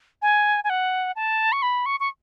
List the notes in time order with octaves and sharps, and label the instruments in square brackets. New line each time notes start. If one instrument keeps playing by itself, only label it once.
[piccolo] G#5
G#5
F#5
A5
C#6
B5
C#6
C#6